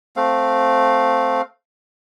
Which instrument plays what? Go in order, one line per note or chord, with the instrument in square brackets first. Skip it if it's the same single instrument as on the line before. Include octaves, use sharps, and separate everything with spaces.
[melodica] A3 C4 F5